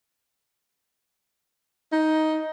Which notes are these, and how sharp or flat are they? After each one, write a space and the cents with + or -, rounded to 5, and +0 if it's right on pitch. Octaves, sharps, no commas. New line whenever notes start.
D#4 +10